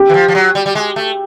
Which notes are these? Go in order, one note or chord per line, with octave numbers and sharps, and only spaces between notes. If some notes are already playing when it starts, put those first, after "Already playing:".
Already playing: G4
E3
F3
F3
F#3
G3
G3
G#3
A3